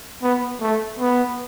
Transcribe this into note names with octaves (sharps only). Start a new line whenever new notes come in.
B3
A3
B3